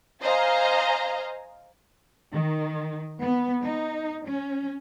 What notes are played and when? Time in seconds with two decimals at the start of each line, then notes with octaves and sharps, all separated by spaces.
0.23 C5 D#5 F5 G#5 A#5
2.33 D#3
3.23 B3
3.63 D#4
4.25 C#4